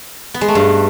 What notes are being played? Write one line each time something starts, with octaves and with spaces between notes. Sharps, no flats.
B3
G#3
A3
G2